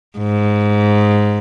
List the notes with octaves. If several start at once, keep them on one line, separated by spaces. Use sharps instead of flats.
G#2